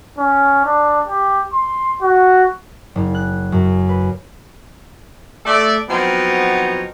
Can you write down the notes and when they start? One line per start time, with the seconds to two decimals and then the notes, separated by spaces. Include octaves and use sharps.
0.18 C#4
0.65 D4
1.07 G4
1.53 C6
2.02 F#4
2.95 F#1
3.15 F#6
3.52 F#2
3.89 B4
5.46 A3 A4 D5
5.89 F3 F#3 B3 C4 D#4 C#5